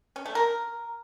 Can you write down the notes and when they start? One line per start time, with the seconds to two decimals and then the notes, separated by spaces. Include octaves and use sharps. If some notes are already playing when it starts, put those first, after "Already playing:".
0.16 C#4
0.26 A3
0.35 A#4